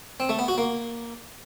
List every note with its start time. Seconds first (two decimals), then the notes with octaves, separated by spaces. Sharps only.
0.20 C4
0.29 A3
0.39 B3
0.48 F#4
0.58 A#3